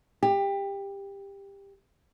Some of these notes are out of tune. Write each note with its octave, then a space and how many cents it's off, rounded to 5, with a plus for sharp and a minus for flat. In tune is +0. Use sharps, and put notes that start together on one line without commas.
G4 +20